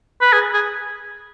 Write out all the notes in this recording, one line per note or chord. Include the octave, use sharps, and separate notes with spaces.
B4
G#4
G#4